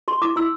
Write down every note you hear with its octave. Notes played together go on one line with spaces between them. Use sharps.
G4 C6
E4 D6
E4 E6